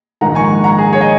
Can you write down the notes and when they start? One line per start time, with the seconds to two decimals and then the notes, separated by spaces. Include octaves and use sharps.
0.21 A#1 G#2 D#3 G#3 F#5 A#5
0.35 G#5 C#6
0.64 F#5 A#5
0.79 G#4
0.93 G#4 C#5
1.01 D#5